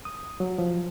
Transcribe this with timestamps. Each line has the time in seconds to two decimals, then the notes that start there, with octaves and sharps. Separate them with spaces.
0.05 D#6
0.40 F#3
0.58 F3